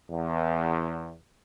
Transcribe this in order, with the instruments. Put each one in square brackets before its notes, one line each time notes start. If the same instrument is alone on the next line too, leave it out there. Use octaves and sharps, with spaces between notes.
[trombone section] E2